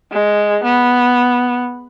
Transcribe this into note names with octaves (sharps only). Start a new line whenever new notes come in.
G#3
B3